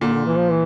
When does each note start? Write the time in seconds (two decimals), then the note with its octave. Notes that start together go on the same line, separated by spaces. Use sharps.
0.01 A#2 D3
0.14 D3
0.26 E3
0.37 F3
0.50 E3